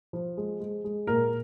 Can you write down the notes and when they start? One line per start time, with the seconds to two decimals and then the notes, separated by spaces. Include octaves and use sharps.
0.13 F3
0.37 G#3
0.60 G#3
0.84 G#3
1.07 A#2 A#4